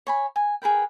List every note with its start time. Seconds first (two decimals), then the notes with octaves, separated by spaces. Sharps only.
0.07 C#5 G#5 B5
0.36 G#5
0.62 G#4 A#4 B4 G5